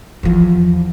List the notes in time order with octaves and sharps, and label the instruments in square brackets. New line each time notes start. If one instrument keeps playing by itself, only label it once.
[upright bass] E2 F3